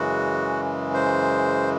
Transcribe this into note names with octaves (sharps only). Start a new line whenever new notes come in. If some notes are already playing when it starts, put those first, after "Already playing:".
Already playing: F#2 C#3 E3 G#3 F#4
C5